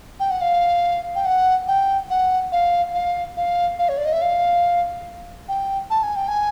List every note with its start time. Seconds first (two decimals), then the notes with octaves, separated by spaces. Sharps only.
0.20 G5
0.30 F#5
0.41 F5
1.15 G5
1.25 F#5
1.68 G5
2.10 F#5
2.52 F5
2.94 F5
3.37 F5
3.79 F5
3.89 C#5
3.98 D5
4.05 D#5
4.13 E5
4.22 F5
5.48 G5
5.90 A5
6.03 G#5
6.16 G5
6.28 G#5